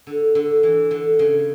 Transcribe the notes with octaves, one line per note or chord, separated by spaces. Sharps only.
D3
D3
E3
D3
C#3